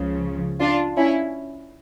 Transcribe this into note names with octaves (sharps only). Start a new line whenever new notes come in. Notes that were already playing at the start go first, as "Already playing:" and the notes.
Already playing: C#2 C#3 F3
D4 F4
C#4 E4